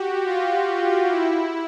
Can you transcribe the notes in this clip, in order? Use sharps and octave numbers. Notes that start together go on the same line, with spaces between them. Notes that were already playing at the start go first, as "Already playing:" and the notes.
Already playing: F#4 G4
F4
E4